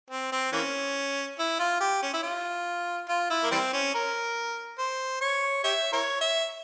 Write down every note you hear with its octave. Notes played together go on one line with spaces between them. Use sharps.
C4
C4
E3 A#3 C#4
E4
F4
G4
C#4
E4
F4
F4
E4
A#3
E3 G3 C4
C#4
A#4
C5
C#5
G4 C#5 E5
E4 A#4 C#5
E5